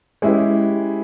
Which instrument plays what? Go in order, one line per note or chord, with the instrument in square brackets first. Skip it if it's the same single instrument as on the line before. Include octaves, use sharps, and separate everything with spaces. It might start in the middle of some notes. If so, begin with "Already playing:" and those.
[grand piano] G#3 C#4 E4 G4 B4